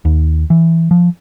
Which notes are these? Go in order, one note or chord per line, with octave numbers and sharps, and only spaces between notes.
D#2
E3
F3